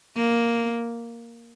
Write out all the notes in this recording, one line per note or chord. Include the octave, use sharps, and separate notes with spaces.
A#3